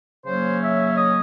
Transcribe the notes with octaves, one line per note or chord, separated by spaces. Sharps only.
C#3 F#3 A#3 C#4 C5
E5
D#5